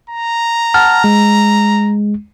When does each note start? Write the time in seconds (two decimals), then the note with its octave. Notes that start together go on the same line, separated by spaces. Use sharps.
0.10 A#5
0.74 F#5 A5 F6
1.04 G#3